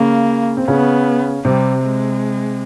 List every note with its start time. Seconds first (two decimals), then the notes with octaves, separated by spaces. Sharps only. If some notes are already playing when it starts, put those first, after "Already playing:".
Already playing: C#3 A#3 C#4
0.57 C4
0.68 C#3 B3 C#4
1.45 C3 G3 C4
1.83 G#3